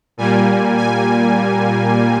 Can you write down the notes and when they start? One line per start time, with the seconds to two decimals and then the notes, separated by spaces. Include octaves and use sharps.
0.17 A#2 G3 A#3 G#5
0.78 G#5